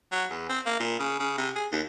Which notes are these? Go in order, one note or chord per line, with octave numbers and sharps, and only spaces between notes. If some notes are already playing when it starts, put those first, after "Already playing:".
F#3
E2
C4
A#3
A#2
C#3
C#3
C3
G#4
D#2